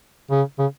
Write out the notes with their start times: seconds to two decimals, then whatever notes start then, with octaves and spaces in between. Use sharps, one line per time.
0.31 C#3
0.59 C#3